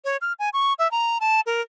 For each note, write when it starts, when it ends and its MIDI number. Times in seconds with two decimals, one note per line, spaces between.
0.05 0.17 73
0.22 0.33 89
0.39 0.49 80
0.53 0.73 85
0.79 0.90 76
0.91 1.18 82
1.20 1.41 81
1.46 1.61 70